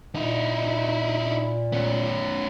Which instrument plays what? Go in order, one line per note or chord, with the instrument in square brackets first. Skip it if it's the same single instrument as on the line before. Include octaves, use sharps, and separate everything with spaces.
[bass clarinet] A#2 [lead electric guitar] D#4 E4
[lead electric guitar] B3 C#4